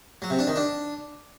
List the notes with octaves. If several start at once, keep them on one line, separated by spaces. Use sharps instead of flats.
F#3
C3
D4
D#3
D4